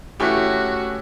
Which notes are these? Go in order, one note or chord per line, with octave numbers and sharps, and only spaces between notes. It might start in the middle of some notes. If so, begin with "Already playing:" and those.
E3 A3 C#4 E4 F#4 G4